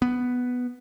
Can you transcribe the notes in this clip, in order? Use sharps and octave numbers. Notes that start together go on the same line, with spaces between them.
B3